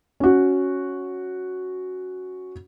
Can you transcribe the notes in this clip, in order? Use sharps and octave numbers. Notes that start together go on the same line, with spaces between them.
C#4 F#4